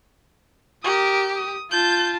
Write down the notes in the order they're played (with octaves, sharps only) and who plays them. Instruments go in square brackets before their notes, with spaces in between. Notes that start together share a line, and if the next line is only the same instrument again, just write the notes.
[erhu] G4 [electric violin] A#4 D#6
[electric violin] D#6
[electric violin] F4 A5 [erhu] G6